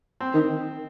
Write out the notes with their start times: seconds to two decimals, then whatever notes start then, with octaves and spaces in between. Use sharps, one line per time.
0.20 C4
0.34 D#3